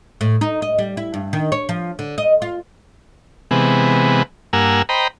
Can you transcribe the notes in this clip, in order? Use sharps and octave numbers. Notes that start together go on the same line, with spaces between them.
A2
D#4
D#5
G3
E4
G2
D#3
C#5
F3
D3
D#5
F4
C3 E3 G#3 B3
G2 A#3 A#4 F#5 G#5 E6
C5 D#5 G5 A#5 B5